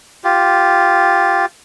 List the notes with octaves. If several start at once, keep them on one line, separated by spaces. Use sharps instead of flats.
F4 G4